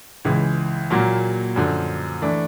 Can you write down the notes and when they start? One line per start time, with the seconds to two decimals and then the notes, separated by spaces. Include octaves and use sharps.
0.25 C#2 C#3 E3 G#3
0.90 A#2 F#3 A#3
1.56 F#2 D3 F3
2.22 E3 A3 D4